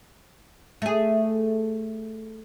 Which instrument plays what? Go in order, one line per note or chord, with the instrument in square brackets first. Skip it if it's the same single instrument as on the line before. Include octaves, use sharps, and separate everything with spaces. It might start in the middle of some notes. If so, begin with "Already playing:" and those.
[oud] A3 G#4